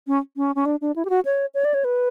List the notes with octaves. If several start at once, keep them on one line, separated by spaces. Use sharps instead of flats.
C#4
C#4
C#4
D4
D4
E4
G4
F#4
C#5
C#5
D5
C#5
B4